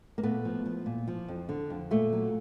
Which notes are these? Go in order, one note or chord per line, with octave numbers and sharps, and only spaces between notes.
A#3
A#2 A3 B3
F3
F3
A#2
F3
F2
D3
F2
A#2 A3
F#3